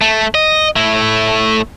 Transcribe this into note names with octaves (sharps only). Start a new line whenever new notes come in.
A3
D#5
A3 E4